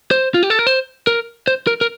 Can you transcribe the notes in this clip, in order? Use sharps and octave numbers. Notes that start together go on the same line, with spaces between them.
C5
F4
G4
A4
A#4
C5
A#4
C5
A#4
A#4